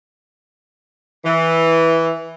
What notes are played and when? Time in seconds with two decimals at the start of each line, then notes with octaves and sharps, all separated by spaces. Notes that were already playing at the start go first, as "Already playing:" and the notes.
1.25 E3